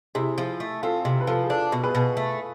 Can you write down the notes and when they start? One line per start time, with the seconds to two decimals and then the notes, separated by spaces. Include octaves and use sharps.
0.15 C3 E4 G#4
0.38 F3
0.60 A3
0.83 C4 F4 A4
1.05 C3
1.21 B4
1.27 F3 F4 A4
1.44 G#4
1.50 D4 F4 A4
1.72 B2
1.84 G#4 B4
1.95 B2
2.17 A3